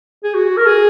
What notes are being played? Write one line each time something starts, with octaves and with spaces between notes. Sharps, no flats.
G#4
F#4
A#4
G#4